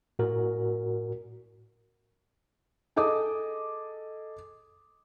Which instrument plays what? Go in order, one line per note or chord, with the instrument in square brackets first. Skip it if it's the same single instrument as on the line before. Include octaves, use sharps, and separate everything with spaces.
[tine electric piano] A2 F#4 A#4
[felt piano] G#4 A4 D#5 D6 D#6